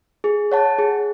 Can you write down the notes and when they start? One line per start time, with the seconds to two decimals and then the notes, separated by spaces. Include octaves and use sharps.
0.24 G#4
0.52 C#5 F#5 A5
0.79 G#4